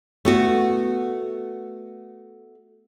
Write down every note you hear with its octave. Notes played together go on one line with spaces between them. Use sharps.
A3 B3 F#4